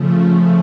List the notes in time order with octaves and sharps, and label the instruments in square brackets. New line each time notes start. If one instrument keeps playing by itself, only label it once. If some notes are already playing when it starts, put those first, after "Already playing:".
Already playing: [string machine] C#3 F3 A3